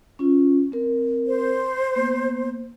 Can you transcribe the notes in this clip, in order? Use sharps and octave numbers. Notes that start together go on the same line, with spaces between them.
C#4 F4
C4 A#4
C5
A#3 B3